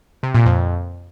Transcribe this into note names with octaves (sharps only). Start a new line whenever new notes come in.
C3
A#2
F2